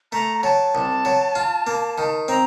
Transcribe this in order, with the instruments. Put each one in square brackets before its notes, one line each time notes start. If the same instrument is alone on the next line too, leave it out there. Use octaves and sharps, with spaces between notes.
[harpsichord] A3 [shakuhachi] A#5
[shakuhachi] A#5
[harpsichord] F#3 [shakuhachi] A5
[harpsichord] C2
F#3
F4
A#3
D#3
[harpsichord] C4 [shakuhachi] A#5